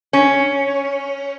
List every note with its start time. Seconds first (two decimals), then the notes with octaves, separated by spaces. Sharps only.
0.13 C#4